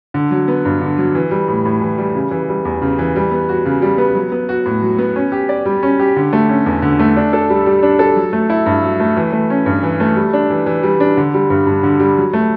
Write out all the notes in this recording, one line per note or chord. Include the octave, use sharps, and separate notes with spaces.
D3
F#3
B3
G2
D3
F#3
E3
G3
A2
A2
E3
G3
C#3
E3
G3
E2
C#3
E3
G3
B3
F#4
C#3
G3
B3
F#3
B3
F#4
A2
F#3
B3
C#4
G4
D5
G3
C#4
G4
D3
A3
C#4
E2
D3
A3
D4
A4
G3
G3
D4
A4
F#3
A3
E4
G2
F#3
A3
E3
A3
C#4
G2
E3
A3
G3
D4
E3
E3
G3
D4
D3
G3
G2
G2
D3
G3
F#3
A3